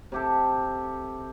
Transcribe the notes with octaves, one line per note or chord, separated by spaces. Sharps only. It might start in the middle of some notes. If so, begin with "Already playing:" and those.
C3 G4 A4